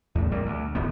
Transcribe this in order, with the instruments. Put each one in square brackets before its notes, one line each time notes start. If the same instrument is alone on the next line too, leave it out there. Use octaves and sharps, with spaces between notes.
[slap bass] E2 A2
A#2 G3 A#3
D2
D1 G1 B3